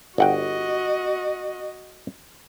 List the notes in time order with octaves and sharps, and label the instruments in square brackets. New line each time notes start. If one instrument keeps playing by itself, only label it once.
[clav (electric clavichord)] G1 F#5 G5 [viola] F#4 D#5